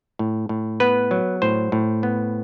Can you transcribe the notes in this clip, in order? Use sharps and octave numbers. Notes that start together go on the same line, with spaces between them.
A2
A2
B3 B4
F#3
A2 C5
A2
B3